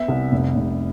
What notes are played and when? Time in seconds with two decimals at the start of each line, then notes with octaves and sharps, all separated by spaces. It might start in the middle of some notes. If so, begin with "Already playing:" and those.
Already playing: B3 E5
0.08 C2
0.32 F1
0.55 F1